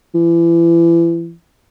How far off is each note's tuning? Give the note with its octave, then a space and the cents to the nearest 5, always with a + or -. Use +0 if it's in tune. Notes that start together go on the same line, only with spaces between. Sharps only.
E3 +35